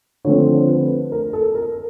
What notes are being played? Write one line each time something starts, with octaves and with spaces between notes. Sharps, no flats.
D3 F3 A3 C4 C#5
B4
A#4
A4
A#4